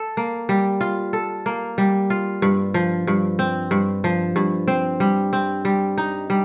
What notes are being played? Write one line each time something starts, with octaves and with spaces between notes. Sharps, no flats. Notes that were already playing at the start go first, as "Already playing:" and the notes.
Already playing: A4
A#3
G3
F4
A4
A#3
G3
F4
G2
F3
G2
C4
G2
F3
G2
C4
G3
C4
G3
D#4
G3